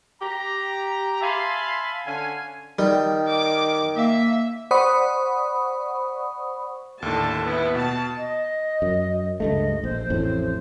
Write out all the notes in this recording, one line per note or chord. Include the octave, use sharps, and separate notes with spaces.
G4 A#5
E5 F5 G#5 A5 B5 C6
D3 C#4 F5 G#5
D#3 G3
D6
A#3 E5
C5 D5 F#5 B5 C#6 D#6
D#2 A2 D3 A5
B3 E4
B2 A5
D#5
F#2
C#2 G2 A3 D#5
A#1 C5
A1 F2 A2